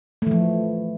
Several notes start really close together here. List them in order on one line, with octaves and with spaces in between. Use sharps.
A3 E3 F3